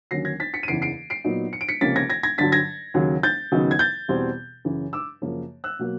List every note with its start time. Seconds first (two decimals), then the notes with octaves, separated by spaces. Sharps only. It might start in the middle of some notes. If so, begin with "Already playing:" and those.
0.11 D#2 D3 F#3 A#3 C#4 A#6 C7
0.25 G#6 A#6
0.40 A6 B6
0.54 B6 C#7
0.63 D#7
0.68 F#1 E2 C#3 E3 C7 D7
0.82 C7 D7
1.10 C7 D7
1.24 A#2 F#3 B3 D#4
1.53 C#7
1.61 D7
1.69 B6 C#7
1.81 C#2 C3 F3 A#3 C#4 A6 B6
1.96 G#6 A#6
2.10 G#6 A#6
2.23 G#6 A#6
2.38 G2 D3 F#3 A6 B6
2.52 G#6 A#6
2.94 D#2 C#3 F#3
3.23 G6 A6
3.52 D#2 C#3 F#3 B3 D#4
3.71 G#6
3.79 G6 A6
4.08 E2 B2 G3 C4
4.65 F#2 C#3 E3
4.93 D6 E6
5.22 F#2 C#3 F3 A#3
5.64 E6 F#6
5.79 B2 F#3 A#3